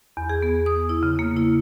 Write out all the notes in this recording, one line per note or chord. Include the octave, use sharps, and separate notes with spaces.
E2
G#4
B3
D#6
E4
C#3
A#3
E4